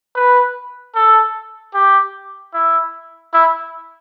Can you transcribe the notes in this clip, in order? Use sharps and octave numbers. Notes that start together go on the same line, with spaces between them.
B4
A4
G4
E4
E4